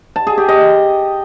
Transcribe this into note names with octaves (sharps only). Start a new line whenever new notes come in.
A5
G#4
G4
D#5